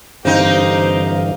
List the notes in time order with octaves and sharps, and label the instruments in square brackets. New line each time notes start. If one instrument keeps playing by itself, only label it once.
[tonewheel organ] G2 D3 E3 [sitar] C4 D#4 [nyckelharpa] G4 F5